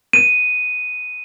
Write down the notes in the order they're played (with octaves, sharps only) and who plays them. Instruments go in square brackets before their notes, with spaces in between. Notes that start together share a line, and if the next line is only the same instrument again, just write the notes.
[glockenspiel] D#7